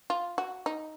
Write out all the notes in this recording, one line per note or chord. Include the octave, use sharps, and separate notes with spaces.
F4
F#4
D#4